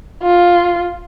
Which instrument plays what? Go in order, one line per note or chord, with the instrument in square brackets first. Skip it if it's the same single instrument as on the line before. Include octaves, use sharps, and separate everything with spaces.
[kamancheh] F4